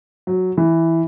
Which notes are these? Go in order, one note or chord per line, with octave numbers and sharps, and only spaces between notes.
F#3
E3